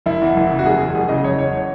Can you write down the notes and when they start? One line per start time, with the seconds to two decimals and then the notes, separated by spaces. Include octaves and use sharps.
0.06 F#1 E4
0.21 E2
0.36 F#1
0.50 C#3
0.59 F#4
0.66 F#1 G#4
0.80 E2
0.95 F#1 G#4
1.09 C#3 D#5
1.24 F#1 C#5
1.38 E2 C#5
1.53 C#5